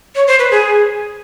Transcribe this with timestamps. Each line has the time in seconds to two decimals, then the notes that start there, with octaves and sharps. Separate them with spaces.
0.16 C#5
0.27 C5
0.39 B4
0.51 G#4